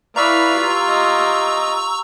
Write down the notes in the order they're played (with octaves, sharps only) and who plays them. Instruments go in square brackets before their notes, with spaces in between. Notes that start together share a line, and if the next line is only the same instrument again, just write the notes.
[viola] E4 [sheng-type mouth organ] B4 D5 F5 [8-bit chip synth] A#5 C#6 E6
[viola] F4 G4
[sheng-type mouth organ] D#5